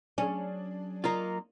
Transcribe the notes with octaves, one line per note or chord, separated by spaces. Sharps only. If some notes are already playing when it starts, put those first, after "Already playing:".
F#3 C#4 D4 G#4
A#3 D#4 F4